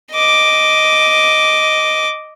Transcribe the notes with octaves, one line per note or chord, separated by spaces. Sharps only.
D#5 D6